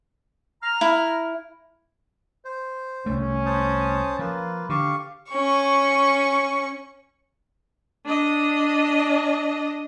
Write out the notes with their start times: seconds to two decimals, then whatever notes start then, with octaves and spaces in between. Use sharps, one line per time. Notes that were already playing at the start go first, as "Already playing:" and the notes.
0.63 A#5 F6
0.81 E4
2.45 C5
3.06 C2 A3 C#4
3.46 C5 A5 D#6
4.19 F3 A#3 F4 B4
4.69 D3 G4 F5 C#6
5.31 C#4 C#6
8.06 D4 D#5